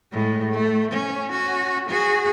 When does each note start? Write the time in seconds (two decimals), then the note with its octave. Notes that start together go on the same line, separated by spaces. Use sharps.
0.12 A2 G#3
0.52 A3
0.91 C#4
1.31 C#4 F#4
1.88 F#4 G#4